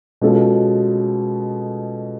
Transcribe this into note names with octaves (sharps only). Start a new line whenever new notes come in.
B2 G#3 C#4 F4 A4